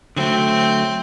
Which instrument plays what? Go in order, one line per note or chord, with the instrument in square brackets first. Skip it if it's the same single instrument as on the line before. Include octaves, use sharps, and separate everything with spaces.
[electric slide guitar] D3 F#3 A3 [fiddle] C4